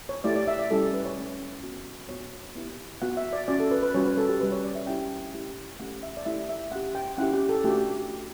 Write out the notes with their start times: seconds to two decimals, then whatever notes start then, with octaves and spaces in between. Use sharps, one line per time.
0.09 C#5
0.24 A3 E4 G4 D5
0.36 D5
0.48 E5
0.59 D5
0.71 G3 C#4 E4 G4 A4
0.94 B4
1.05 C#5
1.17 A3 C#4 E4
1.63 B3 F#4
2.09 B3 D4 F#4 C#5
2.56 B3 E4 G4
3.02 B3 F#4 F#5
3.17 E5
3.33 D5
3.48 C#4 F#4 D5
3.60 A4
3.71 B4
3.83 B4
3.94 G3 C#4 F#4 C#5
4.06 B4
4.18 A4
4.29 G4
4.40 G3 C#4 G4 B4
4.52 C#5
4.64 D5
4.75 E5
4.87 C#4 E4 G4 G5
5.33 A3 E4 G4
5.79 A3 C#4 G4 F#5
6.03 E5
6.17 D5
6.26 A3 E4 G4 E5
6.49 E5
6.72 C#4 G4 F#5
6.95 G5
7.18 C#4 E4 G4 F#5
7.33 G4
7.49 A4
7.64 A3 D4 F#4 G4